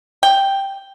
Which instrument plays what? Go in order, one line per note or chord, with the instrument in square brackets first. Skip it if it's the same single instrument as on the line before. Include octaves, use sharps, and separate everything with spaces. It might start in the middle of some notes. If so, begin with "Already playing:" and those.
[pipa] G5